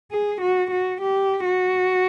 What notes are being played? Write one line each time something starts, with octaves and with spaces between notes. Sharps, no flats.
G#4
F#4
F#4
G4
F#4